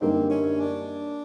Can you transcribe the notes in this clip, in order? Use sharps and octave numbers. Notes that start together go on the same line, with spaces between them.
F#2 D3 G3 A#3 C4 D#4
C#4
D4